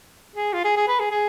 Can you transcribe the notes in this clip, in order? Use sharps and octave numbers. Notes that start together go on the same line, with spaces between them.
G#4
F4
G#4
G#4
B4
G#4
G#4